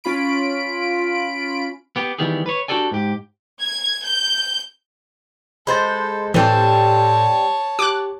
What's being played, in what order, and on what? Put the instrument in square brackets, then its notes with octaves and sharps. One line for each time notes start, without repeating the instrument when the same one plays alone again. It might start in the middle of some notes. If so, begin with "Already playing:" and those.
[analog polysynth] C#4 F4 B5 D7
[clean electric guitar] B3 G4
D#3 E3 G3 B3 G4 G#4
B4 C#5
D4 F#4 G4 A4 D5 G#5
G#2 G4
[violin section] G#6
G6
[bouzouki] G#3 C5 [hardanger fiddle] A4 [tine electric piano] B5 C6 A6
[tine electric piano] A2 A4 G6 [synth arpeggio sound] E3 [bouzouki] G3 C4 [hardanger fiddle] C#5 A5
[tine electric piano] G4 [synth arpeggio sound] D6 F#6